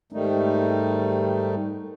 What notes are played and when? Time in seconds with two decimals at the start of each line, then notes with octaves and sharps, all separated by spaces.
0.12 G#2 D#3 G3 A3 D#4